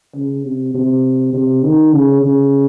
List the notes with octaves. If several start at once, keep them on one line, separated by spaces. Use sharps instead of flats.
C#3
C3
C3
C3
D#3
C#3
C#3